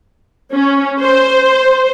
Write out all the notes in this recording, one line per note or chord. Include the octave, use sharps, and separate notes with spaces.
C#4
C5